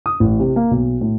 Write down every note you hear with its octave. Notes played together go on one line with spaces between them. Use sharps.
D#6
A1
C3
A#3
B1
A2